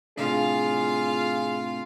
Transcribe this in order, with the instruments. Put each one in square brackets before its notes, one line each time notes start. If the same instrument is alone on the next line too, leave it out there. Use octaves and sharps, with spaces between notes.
[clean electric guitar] A2 C3 D4 [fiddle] F4 F5 [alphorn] G#4